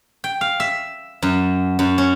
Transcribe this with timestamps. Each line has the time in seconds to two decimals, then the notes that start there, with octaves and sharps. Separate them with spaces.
0.24 G5
0.41 F5
0.60 E5
1.22 F#2
1.79 F#2
1.98 C#4